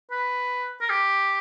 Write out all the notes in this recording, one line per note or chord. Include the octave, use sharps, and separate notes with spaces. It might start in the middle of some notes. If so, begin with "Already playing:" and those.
B4
A#4
G4